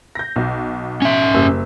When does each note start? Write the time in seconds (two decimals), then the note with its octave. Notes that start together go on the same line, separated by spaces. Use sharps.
0.15 G6 A#6
0.36 B1
1.02 C#4 E5
1.34 F#1 G3 E6